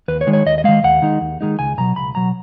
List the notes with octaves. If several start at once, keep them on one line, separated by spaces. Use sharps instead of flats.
D#2 B4
C#5
D#3 G#3
C#5
D#2 D#5
D#5
D#3 G#3 F5
D#2 F#5
D#3 G#3 D#4
D#2
D#3 G#3 D#4
C#2 G#5
B2 F#3 A#5
C#2 B5
B2 F#3 A#5